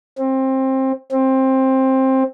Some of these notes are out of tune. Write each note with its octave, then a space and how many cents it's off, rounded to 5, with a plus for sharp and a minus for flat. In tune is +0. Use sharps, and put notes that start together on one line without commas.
C4 +20
C4 +15